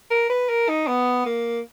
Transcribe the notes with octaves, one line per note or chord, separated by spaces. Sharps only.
A#4
B4
A#4
D#4
B3
A#3